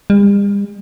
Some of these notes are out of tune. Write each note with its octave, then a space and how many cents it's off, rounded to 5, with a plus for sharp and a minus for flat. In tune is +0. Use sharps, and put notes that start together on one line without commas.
G3 +45